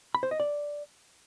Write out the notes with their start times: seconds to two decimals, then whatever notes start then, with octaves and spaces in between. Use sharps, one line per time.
0.15 B5
0.23 C5
0.31 D#5
0.40 D5